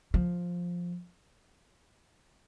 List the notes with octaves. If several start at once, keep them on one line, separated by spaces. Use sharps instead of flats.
F3